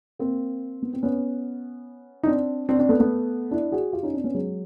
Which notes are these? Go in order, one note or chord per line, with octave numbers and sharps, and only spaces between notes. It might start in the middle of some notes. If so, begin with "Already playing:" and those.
A#3 C4
B3
C4
B3 C#4
D#4
C4 D4
C4 D4
C4 D4
A3 B3
A3 B3
D4 E4
F#4 G#4
F4 G4
C#4 D#4
C4 D4
B3 C#4
F#3 G#3